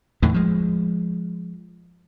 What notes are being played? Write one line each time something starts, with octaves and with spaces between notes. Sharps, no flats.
E2 A2 D3 D#3
F3 G#3